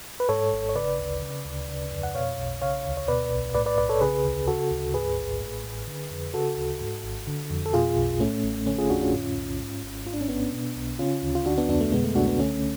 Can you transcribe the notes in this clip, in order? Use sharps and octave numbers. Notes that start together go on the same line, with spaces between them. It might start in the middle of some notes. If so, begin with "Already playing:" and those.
B4
G#2 A4 C#5
G#1
C#5
C#3 B4 D5
D2
C#3
D2
C#3
F2
F#5
B2 C#5 F5
B1
C#3 C#5 F5
D2
C#5
B2 B4 D5
B1
A2 B4 D5
B4 D5
B1 B4 D5
A4 C#5
C#3 G#4 B4
D2
C#3 F#4 A4
D2
G#2 G#4 B4
A1
A2
A1
D3
F2
C#3 F#4 A4
D2
G#2
G#1
D3
F2
A4
B2 F4 G#4
B1
A2 A3 C#4
A1
D3 A3 C#4
F4 G#4
F2 D4 F#4
C#4 F4
A2
B1
G#2
G#1
G#2 F4
D4
C#4
A1 B3 D4
B2
B1
C#3 C#4 F4
D2
F4
D3 D4 F#4
B3 D4
F2 B3 D4
A3
B2 G#3 B3
A3
C#2 D4 F#4
B3 D4
D3 A3 C#4